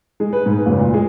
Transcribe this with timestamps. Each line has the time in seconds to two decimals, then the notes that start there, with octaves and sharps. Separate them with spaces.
0.20 G#3
0.33 B4
0.46 G#2
0.66 F#1
0.79 A#2
0.94 G#3